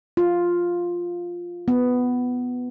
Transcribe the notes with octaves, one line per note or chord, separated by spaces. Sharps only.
F4
B3